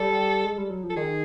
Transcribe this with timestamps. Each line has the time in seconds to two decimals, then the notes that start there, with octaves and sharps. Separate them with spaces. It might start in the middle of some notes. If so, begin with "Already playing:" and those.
Already playing: G3 A4
0.45 G#3
0.58 G3
0.70 F#3
0.84 F3
0.90 A4
0.96 D#3 G#4